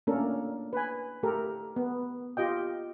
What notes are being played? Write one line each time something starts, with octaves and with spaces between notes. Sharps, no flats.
A3 A#3 C#4 D4 A4 A#4
B4 G#5
A3 G4 A4 A#4
B3
F4 G4 D#5 G5